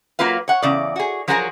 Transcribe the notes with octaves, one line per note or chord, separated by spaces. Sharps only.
F#3 A#3 F4 B4 F5
C#5 F#5
E2 C#3 D5
F#4 G#4
F3 F#3 F#4 G#4 A#4 F#5